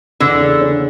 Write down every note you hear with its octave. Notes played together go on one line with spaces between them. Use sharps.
E2 D3
C#3
C#4